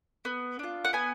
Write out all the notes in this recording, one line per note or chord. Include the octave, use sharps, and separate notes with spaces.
B3
D4 F4
F#5
B3 G#5